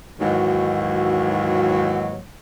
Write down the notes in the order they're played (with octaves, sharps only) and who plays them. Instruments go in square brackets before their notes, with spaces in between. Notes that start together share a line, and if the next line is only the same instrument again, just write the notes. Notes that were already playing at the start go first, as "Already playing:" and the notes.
[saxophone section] D#2 G#2 E3 F#3 F#4